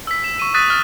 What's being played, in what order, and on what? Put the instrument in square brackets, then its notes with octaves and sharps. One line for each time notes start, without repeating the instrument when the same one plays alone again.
[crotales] E6 B6
E7
C#6 D#7
D#6 F#6 A6 B6 D#7
F6 A6